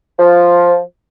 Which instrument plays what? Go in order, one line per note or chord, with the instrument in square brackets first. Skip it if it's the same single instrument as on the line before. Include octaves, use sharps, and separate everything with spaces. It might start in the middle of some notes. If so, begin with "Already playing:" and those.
[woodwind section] F3